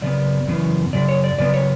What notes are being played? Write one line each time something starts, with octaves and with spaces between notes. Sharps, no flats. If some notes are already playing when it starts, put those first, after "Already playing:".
F#2 C#3 B3 D5
F#2 C#3 E3 B3
F#2 C#3 D5
C#5
D5
F#2 C#3 B3 D5
C#5